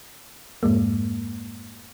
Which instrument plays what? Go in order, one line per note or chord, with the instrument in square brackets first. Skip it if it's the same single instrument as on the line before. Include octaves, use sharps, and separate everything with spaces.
[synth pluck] F2 G#2 G#3 A#3